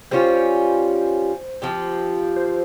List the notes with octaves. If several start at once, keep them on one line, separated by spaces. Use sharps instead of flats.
G3 C#4 F4 C5
F3 C4 G4
C5